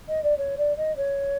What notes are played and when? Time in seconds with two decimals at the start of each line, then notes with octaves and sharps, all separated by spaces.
0.08 D#5
0.23 D5
0.38 C#5
0.58 D5
0.77 D#5
0.96 C#5